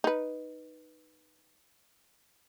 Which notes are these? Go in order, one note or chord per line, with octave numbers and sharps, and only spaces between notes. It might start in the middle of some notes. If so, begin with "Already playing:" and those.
D#4 B4